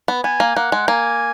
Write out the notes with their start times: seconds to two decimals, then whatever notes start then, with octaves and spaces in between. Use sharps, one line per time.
0.08 B3
0.24 B3 G#5
0.40 A#3
0.56 A#3 F#5
0.72 G#3
0.88 A#3 G#5